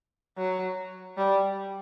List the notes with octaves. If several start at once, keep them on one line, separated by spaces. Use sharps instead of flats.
F#3
G3